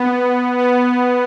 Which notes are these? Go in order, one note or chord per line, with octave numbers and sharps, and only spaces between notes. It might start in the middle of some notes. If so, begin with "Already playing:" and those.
Already playing: B3
B3